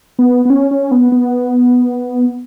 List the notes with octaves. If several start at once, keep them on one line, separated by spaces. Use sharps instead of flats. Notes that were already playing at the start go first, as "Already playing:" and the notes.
B3
B3
C#4
C#4
B3
B3